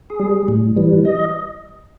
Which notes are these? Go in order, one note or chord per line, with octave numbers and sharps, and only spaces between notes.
G#4
G3
A2
E3 G3
D#5